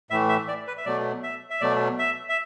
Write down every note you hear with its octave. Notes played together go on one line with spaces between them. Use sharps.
A2 E3 A3 E5
E5
D5
B4
E5
B2 F#3 A3 D5
E5
E5
B2 F#3 A3 D5
E5
E5